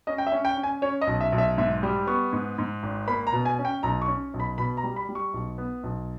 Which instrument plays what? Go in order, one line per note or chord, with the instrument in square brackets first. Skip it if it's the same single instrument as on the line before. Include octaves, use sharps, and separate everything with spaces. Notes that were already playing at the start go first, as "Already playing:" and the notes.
[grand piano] C#4 D#5
G5
E5
C#4
G5
C#4
G#5
C#4 C#5
D#5
B1
E5
B1
E5
G#2 E5
G3
B3 C#6
G#2
G#2
G#1
A#3 B5
A#5
B2
G#5
C#4
G5
B1 A#5
C#6
C#4
B1
B5
B2 B5
A#5
G3
B5
G3
C#6
B1
B3
B1